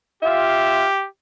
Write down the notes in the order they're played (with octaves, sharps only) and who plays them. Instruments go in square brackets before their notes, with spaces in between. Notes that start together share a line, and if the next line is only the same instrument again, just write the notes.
[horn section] F4 E5 F5 [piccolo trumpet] G4